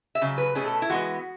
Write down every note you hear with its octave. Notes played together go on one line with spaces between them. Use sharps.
E5
C#3 F#3
B4
B2 A3 C#4 G#4
A4
E4
E3 G#3 B3 F#4